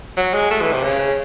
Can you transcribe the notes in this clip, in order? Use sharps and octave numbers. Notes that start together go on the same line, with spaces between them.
F#3
G#3
A3
E3
C3
C#3